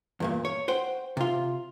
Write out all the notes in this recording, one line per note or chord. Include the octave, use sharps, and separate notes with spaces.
E2 G2 A#2
C#5
C5 F#5 G5
C3 F4